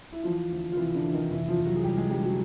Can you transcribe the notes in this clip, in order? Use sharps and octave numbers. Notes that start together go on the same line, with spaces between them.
E4
E3 F3 F4
D2
F4
C3 E3 E4
D3 D4
E3
D#3 D#4
F1 E3 E4
F3 F4
F1
F#3 F#4
G#4
F1 G3 G4
G#3 G#4
D3 G3 G4
F#3 F#4